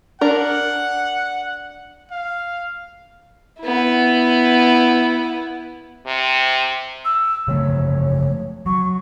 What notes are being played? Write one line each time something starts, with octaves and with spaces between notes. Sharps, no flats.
D4 A#4 F#5
F5
B3 E4
C3
E6
C#3 F3 A3 C#5
F#3 C#6